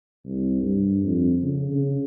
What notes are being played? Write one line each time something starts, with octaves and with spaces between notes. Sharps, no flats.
C2
G2
F2
C#3
C#3